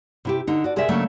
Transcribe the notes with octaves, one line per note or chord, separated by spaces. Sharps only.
C3 E4 G4
D3 D#4
F#4 D5
C3 G#4 A#4 D5 E5
C#3 F#3 A3 A#3 D4